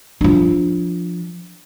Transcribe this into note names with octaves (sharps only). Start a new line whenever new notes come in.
F3 D4